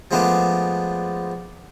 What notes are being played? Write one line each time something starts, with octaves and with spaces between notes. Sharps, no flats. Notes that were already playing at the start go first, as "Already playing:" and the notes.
F3 G#3 A3 B3 D4